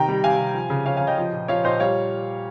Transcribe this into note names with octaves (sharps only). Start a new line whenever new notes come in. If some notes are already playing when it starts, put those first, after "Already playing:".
Already playing: C3 D#3 G5 A#5
G3
C3 F5 G#5
C3
F3
C#3
F3 C#5 F5
F5 G#5
C#3
D#5 G5
F3
A#2
F3 C#5 F5
A#2 C5 D#5
G3 C#5 F5